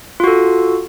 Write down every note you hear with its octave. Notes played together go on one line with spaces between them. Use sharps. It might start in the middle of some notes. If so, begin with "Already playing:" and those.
F4 F#4 A4